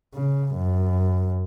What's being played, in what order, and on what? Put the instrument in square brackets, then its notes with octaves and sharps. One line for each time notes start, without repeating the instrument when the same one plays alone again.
[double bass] C#3
F#2